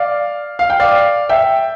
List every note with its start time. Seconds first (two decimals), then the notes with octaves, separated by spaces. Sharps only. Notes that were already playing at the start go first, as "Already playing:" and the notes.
Already playing: D5 F5
0.59 F5
0.70 G5
0.80 D5 F5
1.29 E5 G5